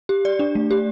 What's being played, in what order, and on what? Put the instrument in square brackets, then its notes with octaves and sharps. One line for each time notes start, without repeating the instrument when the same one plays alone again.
[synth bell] G4
D5
D4
A3
G4